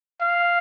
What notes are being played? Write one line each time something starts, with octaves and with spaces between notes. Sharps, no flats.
F5